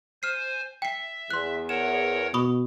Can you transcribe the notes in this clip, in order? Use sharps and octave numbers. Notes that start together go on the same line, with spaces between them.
C5 G#5 F6 C7
E5 G5 C7
E2 C6 F#6
A#4 C#5 F#5 E7
B2 B5 C#6 D#6